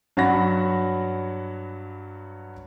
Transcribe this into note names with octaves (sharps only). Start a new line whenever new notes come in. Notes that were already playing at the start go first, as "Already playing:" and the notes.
G2 F#3 F#4 F#5 B5 A#6